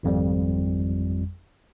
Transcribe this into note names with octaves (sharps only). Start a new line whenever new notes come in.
G#1 F2 G3